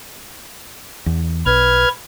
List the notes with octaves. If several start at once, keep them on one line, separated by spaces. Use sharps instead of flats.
E2
B1 B4 F6 G#6